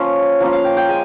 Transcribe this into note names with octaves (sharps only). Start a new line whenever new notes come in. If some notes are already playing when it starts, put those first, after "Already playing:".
Already playing: F3 A#3 C#4 F4
F3 A#3 C#4 F4
F5
G5
G5
G#3 G#5